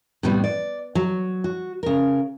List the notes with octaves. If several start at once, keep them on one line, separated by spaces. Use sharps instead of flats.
A2 C3 G3 B3
D5
F#3
F#4
C#3 A#4